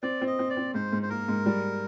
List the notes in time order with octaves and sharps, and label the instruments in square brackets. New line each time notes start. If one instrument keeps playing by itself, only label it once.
[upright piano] C4 [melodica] D5
[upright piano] C4
[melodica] D#5
[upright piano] C4
[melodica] D5
[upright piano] C4
[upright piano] G#2 [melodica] C5
[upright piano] G#2
[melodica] C5
[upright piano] A#3 [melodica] A#4
[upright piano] G#2
G3